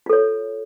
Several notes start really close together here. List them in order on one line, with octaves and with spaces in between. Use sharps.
F4 A4 C#5